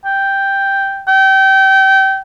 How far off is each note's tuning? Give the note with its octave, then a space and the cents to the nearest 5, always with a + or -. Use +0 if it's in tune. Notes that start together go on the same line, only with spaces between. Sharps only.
G5 +0
G5 -25